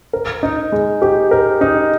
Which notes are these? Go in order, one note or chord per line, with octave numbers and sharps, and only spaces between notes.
A#4
D#4
G#3
G4
A#4
D#4